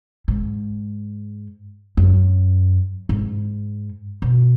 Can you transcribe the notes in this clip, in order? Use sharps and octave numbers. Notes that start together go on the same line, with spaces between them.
G#2
F#2
G#2
B2